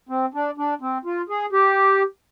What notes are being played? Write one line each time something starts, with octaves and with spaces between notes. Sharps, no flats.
C4
D4
D4
C4
F4
G#4
G4